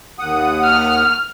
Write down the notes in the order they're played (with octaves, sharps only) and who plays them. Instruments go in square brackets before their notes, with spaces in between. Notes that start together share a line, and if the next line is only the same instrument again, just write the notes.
[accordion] D#2 F#5 D#6
[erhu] F6